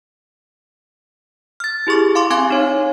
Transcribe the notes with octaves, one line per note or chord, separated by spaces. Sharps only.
F6 A6
E4 G4 G#4 C#6 D6
F5 C6 D6
C4 F5 G#5 D6 G#6
D#4 C#5